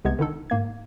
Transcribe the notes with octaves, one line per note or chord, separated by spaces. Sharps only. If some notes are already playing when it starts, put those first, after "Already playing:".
C2 C3 G#3 B3 G#6
D3 D#3 D#4 A4
G#2 A#3 G#6